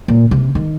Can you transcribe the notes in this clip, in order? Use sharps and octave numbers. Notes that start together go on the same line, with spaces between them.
A#2
C3
D#3